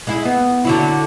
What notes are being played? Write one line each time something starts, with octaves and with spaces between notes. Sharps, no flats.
G#3 E4
B3
D3 F#3 E4